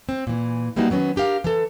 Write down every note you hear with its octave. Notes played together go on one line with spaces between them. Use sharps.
C4
A#2 E3
E3 G3 A#3 D4 D#4 F#4
D#3 F#3 B3 C#4
D4 G4 A#4 F5
E3 A4